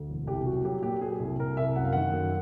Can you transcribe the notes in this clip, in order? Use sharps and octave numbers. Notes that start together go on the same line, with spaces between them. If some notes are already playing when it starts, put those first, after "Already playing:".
Already playing: D2
E1
C2 G4
F#3 F#4
F#3 G4
A#2 G4
F#3 G#4
C2
C2 A#4
C2 E5
F#2 F#5
F5
D#3 F#5
F#2